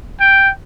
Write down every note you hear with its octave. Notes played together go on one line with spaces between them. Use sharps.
G5